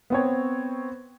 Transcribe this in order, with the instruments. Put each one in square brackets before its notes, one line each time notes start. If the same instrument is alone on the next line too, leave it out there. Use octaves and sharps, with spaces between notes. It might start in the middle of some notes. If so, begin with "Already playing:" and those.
[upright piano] B3 C4 C#5